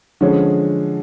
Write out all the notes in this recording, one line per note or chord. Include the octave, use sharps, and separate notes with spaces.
D3 F3 G#3 C#4